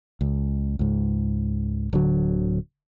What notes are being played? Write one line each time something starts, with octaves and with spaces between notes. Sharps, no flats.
C#2
C#2 G#2
D1 D3 F#3